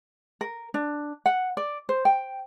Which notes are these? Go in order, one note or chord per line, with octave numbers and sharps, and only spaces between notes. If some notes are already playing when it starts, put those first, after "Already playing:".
A#4
D4
F#5
D5
C5
G5